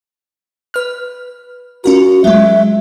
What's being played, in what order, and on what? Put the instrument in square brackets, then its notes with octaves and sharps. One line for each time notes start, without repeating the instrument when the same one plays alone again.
[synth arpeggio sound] B4 F6
[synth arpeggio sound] C#4 F4 A#4 [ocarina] F#4
[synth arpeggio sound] F#3 G#3 [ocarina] E5